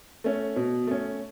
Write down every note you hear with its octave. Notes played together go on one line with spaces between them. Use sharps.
A3 C#4
B2
A3 C#4